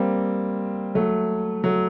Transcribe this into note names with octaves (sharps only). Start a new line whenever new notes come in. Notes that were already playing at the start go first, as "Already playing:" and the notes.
Already playing: G3 A#3 C4
F#3 A3
F#3 A3